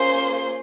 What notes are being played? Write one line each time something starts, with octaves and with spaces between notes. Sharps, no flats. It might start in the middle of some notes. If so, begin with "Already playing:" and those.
Already playing: A#3 C#4 F4 G#4 C5 C6